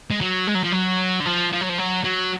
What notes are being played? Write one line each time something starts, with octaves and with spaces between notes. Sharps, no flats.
G#3
F#3
G#3
F#3
F3
F#3
D3
F3
F3
F#3
F3
F#3
F#3